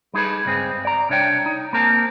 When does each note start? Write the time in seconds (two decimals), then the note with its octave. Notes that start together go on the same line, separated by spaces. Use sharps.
0.14 G3 D#4 G#4 A4 B4
0.45 C#2 G2 C4 G#4
0.85 D5 A#5
1.09 C2 D4 C#5 D5 G5
1.46 D#4
1.73 A#3 C4 A#4 A5